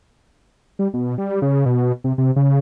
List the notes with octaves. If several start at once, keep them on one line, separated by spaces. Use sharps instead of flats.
G3
B2
G3
C#3
B2
C3
C3
C#3